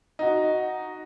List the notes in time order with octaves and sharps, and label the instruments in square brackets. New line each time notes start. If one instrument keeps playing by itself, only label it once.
[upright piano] D#4 F#4